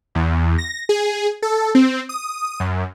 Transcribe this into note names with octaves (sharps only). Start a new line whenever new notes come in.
E2
A#6
G#4
A4
C4
D#6
F#2